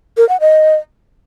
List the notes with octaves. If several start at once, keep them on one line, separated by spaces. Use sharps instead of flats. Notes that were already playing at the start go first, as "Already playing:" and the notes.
A#4
F#5
D#5